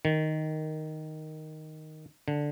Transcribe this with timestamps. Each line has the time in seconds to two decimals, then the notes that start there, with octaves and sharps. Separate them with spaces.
0.05 D#3
2.28 D3